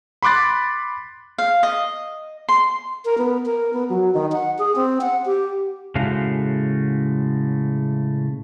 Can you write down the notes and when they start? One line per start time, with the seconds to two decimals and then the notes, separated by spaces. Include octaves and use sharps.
0.23 B5 C6 D6 F#6 A6
1.38 F5
1.63 D#5
2.49 C6
3.05 A#4
3.18 B3
3.46 A#4
3.73 B3
3.90 F#3
4.14 D#3
4.32 F#5
4.58 G#4
4.76 C4
5.01 F#5
5.25 G4
5.95 A2 C#3 G#3 A3 F#4 F5